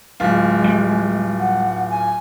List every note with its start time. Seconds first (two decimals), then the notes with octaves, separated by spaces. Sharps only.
0.20 D1 G#3 F4
0.64 G3
1.39 F#5
1.89 G#5